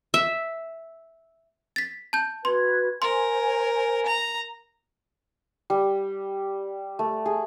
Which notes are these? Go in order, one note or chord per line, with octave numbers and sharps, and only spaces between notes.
E5
A6 B6
A5 G6
F#4 B4 C6 G#6
A#4 C5 G#5 C6
A#5
G3
A3
G#4